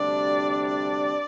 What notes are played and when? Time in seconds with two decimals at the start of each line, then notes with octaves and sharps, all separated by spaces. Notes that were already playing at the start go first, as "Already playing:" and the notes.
Already playing: D2 C3 G3 D4 D5
0.67 D5